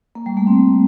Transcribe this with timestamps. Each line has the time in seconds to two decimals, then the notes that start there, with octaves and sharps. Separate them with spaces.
0.15 A#3
0.26 G3
0.37 A3
0.47 C4